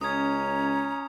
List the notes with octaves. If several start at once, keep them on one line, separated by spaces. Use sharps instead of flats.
C#2 C#4 A#5 D#6 G#6